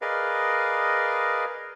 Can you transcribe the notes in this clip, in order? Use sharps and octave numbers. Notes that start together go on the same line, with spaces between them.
G#4 A#4 B4 D5 D#5 F5